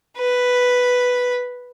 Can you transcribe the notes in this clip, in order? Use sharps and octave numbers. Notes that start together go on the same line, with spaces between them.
B4